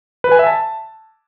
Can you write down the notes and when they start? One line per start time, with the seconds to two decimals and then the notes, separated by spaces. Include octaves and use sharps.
0.24 B4
0.32 G#5
0.39 E5
0.47 A5